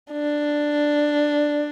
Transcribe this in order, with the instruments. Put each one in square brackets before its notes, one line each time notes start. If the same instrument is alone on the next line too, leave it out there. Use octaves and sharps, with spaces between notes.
[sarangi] D4